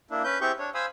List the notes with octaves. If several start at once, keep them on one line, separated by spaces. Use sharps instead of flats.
A#3 D4 E4
C#4 B4 G6
C4 E4 G4 G#4 C#6 G6
D4 C#5
C5 F5 G#5 B5 D#6 E6